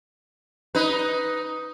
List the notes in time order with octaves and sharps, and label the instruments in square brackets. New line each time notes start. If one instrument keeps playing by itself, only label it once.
[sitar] D#4 B4